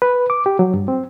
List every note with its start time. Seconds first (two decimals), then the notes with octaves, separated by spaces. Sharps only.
0.02 B4
0.30 D6
0.46 G4
0.59 F#3
0.74 G2
0.88 C4